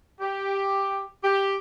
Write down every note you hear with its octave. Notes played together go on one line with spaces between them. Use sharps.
G4
G4